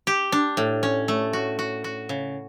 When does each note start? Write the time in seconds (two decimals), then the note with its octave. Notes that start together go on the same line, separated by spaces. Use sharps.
0.07 G4
0.32 D4
0.57 A2
0.83 C#4
1.08 A3
1.33 F#4
1.59 F#4
1.84 F#4
2.09 C#3